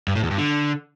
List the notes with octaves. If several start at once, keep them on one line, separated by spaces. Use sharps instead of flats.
G2
A2
E2
G2
D3